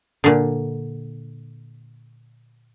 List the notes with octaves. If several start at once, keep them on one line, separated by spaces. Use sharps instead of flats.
A#2 D3